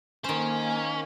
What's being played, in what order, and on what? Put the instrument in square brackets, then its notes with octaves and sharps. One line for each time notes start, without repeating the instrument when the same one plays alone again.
[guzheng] D#3 C5 [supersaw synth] A#3 G#5 [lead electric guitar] C#4